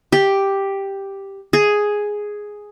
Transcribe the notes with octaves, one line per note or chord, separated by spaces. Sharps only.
G4
G#4